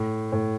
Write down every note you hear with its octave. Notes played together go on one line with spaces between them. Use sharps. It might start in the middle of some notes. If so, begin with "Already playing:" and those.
Already playing: A2
A2